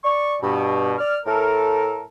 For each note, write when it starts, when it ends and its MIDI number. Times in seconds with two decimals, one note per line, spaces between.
0.03 0.36 74
0.03 0.36 85
0.42 0.95 43
0.42 0.95 47
0.99 1.17 74
0.99 1.17 89
1.26 2.03 45
1.26 2.03 57
1.26 2.03 69
1.26 2.03 70